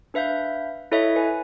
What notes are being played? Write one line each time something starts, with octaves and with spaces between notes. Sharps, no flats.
D4 B4 E5 F5 G6
E4 A4 C#5 D#5 E5
B4 G#5